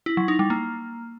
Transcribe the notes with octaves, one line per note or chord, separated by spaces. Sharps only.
E4
F#3
D#4
G3
A#3